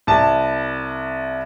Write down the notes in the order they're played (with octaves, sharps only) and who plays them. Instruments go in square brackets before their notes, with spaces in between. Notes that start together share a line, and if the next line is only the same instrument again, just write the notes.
[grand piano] C2 A5